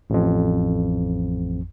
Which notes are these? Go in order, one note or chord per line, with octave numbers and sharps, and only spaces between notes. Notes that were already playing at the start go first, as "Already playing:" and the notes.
A1 F2